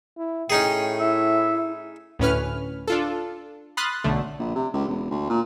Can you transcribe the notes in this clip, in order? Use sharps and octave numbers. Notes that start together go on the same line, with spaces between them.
E4
A2 C#4 D#4 G#4 G5
E4 E5
D2 A2 C#4 B4 F6
D4 F4 A4
B5 C6 D#6 F6 F#6 A6
B1 D3 A3
A#1
C3
C#2
E1
D2
A#2